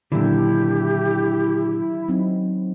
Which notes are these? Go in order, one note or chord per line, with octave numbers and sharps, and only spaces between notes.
A#2 D3 D#3 F#3 D4 E4 G4
F#3 C4 D#4